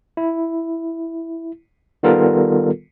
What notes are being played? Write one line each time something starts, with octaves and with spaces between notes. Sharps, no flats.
E4
D#3 G3 B3 F4 A4 A#4